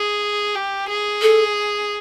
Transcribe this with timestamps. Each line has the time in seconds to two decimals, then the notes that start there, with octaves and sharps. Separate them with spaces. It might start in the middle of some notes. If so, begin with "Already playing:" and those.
Already playing: G#4
0.55 G4
0.88 G#4
1.22 A4